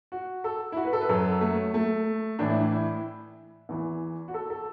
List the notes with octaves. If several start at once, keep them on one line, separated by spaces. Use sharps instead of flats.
F#4
A4
E4
F#4
B4
A4
B4
F#2 F#3 A4
A3
A3
A2 E3 D4
E4
D4
E4
E2 E3
F#4
A4
A4